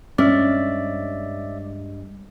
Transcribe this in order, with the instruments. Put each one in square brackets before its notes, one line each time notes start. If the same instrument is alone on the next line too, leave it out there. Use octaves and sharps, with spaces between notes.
[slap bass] G2 G#3 [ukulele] C#4 [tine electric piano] D5 E5